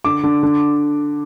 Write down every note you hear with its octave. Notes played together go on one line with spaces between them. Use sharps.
D3 D6
D3
D3